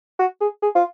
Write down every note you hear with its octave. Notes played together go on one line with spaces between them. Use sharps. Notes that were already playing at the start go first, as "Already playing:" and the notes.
F#4
G#4
G#4
F4